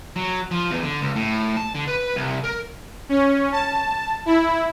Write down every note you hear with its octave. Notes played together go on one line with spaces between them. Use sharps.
F#3
F3
E2
D3
C#2
A2
A5
D3
B4
C2
A#4
C#4
A5
E4